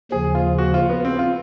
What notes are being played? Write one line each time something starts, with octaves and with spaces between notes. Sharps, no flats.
D#2 C#3 F3 G#4
F4
F#4
F4
B3
C4
F4